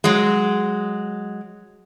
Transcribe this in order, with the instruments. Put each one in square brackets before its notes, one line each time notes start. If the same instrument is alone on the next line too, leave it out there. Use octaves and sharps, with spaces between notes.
[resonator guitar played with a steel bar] F#3 G#3